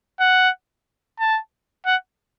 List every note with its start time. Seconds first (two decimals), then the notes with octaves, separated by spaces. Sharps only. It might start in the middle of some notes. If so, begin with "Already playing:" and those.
0.20 F#5
1.19 A5
1.86 F#5